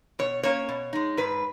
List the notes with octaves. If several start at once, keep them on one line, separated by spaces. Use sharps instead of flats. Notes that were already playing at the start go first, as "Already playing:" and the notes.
B2 C#5
A#3 C#4 C#5
B2
G#3 D#4
G#2 B4